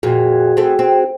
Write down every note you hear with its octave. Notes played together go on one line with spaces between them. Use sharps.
F2 A#2 F#4 G#4
A3 C4
C4